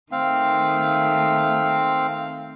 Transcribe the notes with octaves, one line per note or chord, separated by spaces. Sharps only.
D#3 A3 C4 F5